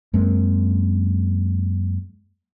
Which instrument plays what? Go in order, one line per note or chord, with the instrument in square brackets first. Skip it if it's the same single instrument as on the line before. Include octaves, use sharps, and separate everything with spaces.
[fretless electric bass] F#2 G#3 A#3 C4